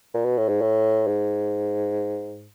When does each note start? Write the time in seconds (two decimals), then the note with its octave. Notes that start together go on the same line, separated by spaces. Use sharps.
0.14 A#2
0.25 B2
0.38 A2
0.49 G#2
0.61 A2
1.07 G#2